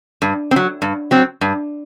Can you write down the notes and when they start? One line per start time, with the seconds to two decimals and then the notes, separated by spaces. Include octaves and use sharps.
0.22 G2
0.51 C4
0.56 F#3
0.82 G2
1.11 F#3 C4
1.41 G2